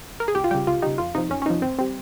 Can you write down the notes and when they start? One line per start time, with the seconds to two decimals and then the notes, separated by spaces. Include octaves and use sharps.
0.20 A#4
0.28 G#4
0.35 C#2 G4
0.44 F4
0.51 C#3 G3 G4
0.67 C#2 F4
0.82 C#3 G3 D#4
0.98 F2 F4
1.15 C3 F3 D#4
1.30 F2 C#4
1.42 C#4
1.46 C3 F3 D#4
1.62 G#1 C4
1.79 G3 C4